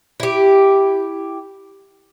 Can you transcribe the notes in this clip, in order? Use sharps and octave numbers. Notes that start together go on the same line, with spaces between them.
E4 G4